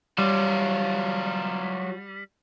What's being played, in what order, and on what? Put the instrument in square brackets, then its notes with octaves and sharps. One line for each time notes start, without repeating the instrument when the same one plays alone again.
[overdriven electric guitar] F#3 F4 [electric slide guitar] G3